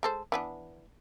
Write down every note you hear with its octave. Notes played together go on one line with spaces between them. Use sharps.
G#3 A4 C5
E3 B3 D4